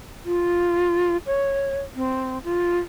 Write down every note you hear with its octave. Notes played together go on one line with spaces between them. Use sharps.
F4
C#5
C4
F4